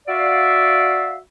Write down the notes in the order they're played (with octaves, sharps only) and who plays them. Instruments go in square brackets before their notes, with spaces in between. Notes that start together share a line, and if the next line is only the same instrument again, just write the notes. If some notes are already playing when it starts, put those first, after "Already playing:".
[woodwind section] F#4 D5 E5 F5